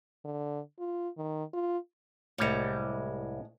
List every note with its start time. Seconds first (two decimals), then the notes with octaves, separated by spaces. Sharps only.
0.25 D3
0.79 F4
1.17 D#3
1.53 F4
2.38 C2 A2 G3 G#3 C#5